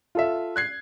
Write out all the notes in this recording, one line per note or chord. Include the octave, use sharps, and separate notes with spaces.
F4 A4 E5
F#6 G#6 C7